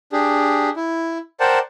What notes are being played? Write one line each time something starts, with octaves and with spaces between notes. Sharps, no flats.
D4 G4 G#4
E4
A#4 C5 D5 F#5 G5 A5